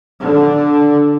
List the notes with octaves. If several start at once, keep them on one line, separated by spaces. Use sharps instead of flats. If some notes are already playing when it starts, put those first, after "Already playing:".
D3